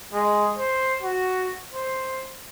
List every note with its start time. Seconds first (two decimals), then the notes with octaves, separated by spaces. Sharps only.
0.13 G#3
0.58 C5
1.02 F#4
1.74 C5